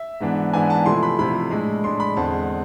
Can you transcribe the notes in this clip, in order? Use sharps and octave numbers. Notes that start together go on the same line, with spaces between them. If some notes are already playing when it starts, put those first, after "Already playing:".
Already playing: E5
G#2 E3 B3 D4
G#2 E3 B3 D4 G#5
A5
C3 F3 A3 E4 C6
B5
C3 F3 A3 E4 B5
A2 G#3 D4
A2 G#3 D4 C6
B5
E2 D3 G#3 C4 A5